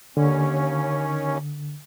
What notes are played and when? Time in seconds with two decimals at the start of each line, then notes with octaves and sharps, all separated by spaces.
0.17 D#2 D3 C#4